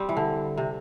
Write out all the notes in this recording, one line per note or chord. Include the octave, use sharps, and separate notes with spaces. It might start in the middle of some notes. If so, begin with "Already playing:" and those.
Already playing: G3 C4
E3
D3
C3